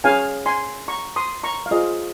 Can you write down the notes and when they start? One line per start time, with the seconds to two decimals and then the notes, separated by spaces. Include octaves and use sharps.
0.04 C#4 G#4 C#5 F5 G#5
0.46 G#5 C6
0.88 A#5 C#6
1.16 C6 D#6
1.44 A#5 C#6
1.66 F5
1.71 F4 G#4 C5 D#5